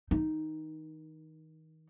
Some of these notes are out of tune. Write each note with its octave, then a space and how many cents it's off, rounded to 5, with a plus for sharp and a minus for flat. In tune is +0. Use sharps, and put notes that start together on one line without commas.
D#3 +35 D#4 +0